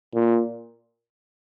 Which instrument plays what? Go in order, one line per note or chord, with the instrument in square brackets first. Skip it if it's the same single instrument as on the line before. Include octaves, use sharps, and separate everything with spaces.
[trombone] A#2